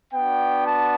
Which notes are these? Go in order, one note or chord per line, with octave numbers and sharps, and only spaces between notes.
B3 D4 F#4 G5
A5